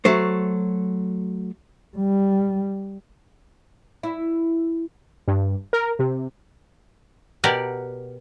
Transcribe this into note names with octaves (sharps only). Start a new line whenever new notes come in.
F#3 A3 C5
G3
E4
G2
A#4
C3
B2 G4 A#4 D5 F#5